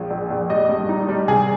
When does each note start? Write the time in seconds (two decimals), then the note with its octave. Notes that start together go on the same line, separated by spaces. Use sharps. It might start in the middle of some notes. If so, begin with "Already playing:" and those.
Already playing: A#1 F3 G#3
0.11 A#1
0.30 A#1
0.50 G3 D#5
0.69 G2
0.89 D#4
1.09 G3
1.28 C3 G#4